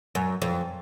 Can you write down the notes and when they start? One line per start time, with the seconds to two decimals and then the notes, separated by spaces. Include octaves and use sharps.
0.15 F#2
0.42 F2